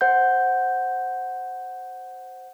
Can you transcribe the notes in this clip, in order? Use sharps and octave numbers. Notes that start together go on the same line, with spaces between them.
C5 F#5 G6